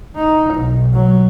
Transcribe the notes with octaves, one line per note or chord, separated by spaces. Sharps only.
D#4
B1
F#3